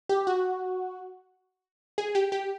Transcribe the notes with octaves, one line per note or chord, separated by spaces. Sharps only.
G4
F#4
G#4
G4
G4